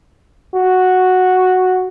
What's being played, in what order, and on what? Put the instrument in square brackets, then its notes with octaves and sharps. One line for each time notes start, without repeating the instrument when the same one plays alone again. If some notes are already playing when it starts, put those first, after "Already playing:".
[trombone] F#4